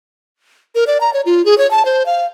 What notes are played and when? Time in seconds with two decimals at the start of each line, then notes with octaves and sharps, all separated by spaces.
0.75 A#4
0.87 D5
1.01 A#5
1.14 C#5
1.26 F4
1.45 G#4
1.58 C#5
1.71 A5
1.85 C5
2.06 F5